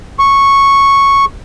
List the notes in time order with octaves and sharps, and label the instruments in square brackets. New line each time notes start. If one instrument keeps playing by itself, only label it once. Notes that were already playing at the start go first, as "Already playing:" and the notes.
[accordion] C#6